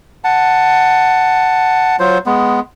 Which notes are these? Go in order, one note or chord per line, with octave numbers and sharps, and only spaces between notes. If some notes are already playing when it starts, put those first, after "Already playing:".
F#5 A5
F#3 F4 C5
G#3 B3